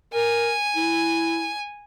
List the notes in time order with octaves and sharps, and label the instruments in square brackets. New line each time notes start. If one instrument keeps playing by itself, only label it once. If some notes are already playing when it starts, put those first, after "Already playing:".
[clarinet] A#4 [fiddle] G#5
[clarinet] E4